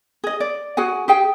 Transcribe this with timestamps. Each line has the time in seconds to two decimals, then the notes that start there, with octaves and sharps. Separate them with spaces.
0.24 G#4 D#5
0.40 D5
0.77 F#4 G#4 F#5 G#5
1.08 G4 G#4 G5